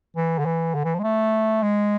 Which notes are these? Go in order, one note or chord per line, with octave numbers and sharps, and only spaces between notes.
E3
D3
E3
D3
E3
F3
G#3
A3
G#3